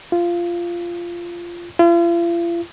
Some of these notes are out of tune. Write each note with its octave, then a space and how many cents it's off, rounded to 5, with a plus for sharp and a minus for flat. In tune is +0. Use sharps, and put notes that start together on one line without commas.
F4 -15
F4 -45